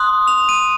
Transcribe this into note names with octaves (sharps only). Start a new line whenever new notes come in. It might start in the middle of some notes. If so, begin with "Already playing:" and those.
Already playing: C6 D#6 F#6
F7
D#7